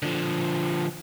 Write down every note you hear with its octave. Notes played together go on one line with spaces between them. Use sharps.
D3 F3